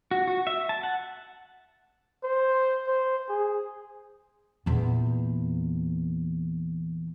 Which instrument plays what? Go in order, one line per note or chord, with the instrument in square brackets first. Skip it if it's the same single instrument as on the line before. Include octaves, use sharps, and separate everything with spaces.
[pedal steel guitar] F#4
F#4
E5
A5
F#5
[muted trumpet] C5
C5
G#4
[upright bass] E2 A#2